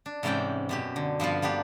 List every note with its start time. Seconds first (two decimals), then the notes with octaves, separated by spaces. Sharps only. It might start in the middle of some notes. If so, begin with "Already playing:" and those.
0.06 D4
0.23 G#2 C3 E3 C#4 D5 G5
0.69 F#2 B2 G4
0.96 D3
1.20 G2 F3 B3 F4
1.42 A#3 B3 D4 G4